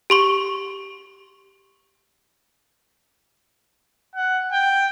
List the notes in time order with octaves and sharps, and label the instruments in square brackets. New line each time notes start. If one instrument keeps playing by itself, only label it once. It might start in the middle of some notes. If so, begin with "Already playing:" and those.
[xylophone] G4 C6 C#6
[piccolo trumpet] F#5
G5